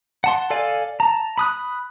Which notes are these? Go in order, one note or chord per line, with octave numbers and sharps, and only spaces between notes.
F#5 A5 C6
A4 D5 F5 G#5
A5 A#5
B5 D#6 F#6